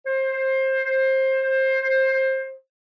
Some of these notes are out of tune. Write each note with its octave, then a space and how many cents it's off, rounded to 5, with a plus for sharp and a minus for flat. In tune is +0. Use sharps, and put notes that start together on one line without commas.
C5 +20